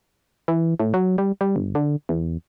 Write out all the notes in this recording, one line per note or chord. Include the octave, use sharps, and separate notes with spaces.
E3
A2
F#3
G3
G3
G1
D3
E2